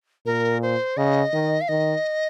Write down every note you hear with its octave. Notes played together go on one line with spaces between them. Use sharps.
A#2 A#4
C5
C#3 D#5
D#3
F5
D#3 D#5